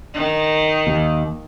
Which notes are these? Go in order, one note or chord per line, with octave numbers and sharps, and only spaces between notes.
D#3
D#2